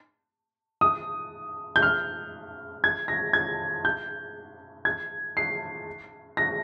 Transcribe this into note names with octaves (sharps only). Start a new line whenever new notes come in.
D#6
G6
F6
G#6
A#6
G#6
G6
G#6
C7
A#6